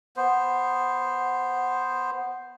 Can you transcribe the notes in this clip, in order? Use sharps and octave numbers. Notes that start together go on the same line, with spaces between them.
B3 C5